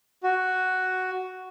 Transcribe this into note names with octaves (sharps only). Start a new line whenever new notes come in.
F#4